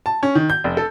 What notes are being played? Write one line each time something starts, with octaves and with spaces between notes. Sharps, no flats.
A5
C#4
D#3
G6
F1
A4